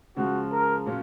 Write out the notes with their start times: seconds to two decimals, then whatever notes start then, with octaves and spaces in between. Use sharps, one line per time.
0.16 C#3 F3 G#3 F#4
0.52 A#4
0.86 A#2 F#3 C#4 F4